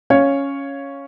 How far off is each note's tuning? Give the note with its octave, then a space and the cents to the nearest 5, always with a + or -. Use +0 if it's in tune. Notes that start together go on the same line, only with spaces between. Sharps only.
C#4 +0 C#5 +0 F5 +0